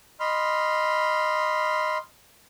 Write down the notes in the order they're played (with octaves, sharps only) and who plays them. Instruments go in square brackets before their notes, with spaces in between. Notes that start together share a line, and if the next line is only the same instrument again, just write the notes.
[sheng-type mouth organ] D#5 B5 C6 F6